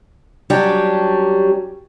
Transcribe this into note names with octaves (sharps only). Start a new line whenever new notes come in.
F#3 G3 C#4 D4 G4